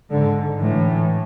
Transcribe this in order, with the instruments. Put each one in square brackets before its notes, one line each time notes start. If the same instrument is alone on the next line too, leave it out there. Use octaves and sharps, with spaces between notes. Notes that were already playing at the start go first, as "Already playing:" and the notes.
[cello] G#2 [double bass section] D3
[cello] A2 [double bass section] E3